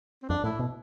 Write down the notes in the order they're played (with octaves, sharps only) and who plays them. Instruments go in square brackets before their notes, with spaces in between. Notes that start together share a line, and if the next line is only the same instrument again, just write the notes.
[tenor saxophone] C4
[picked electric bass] F2 [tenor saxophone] D4
[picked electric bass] A2 [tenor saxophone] E4
[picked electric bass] B2